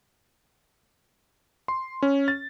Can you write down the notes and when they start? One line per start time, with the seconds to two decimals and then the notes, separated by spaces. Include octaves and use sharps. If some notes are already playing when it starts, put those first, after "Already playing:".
1.68 C6
2.02 C#4
2.28 A6